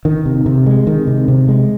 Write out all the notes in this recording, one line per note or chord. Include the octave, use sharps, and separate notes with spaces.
D#3
C3
C3
G#3
D#3
C3
C3
G#3